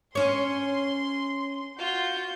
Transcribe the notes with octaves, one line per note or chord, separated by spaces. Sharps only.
C#4 C#5 C6
F4 F#4 G6